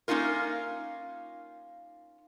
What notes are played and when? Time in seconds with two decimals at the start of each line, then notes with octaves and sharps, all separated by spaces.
0.08 A#3 C#4 D#4 F4 A#4